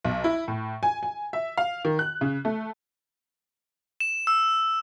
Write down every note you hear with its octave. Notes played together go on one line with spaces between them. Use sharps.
B1
E4
A2
G#5
G#5
E5
F5
D#3
F#6
C#3
A3
E7
E6